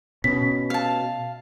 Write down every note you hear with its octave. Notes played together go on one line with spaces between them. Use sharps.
B2 C#4 B6
F5 A5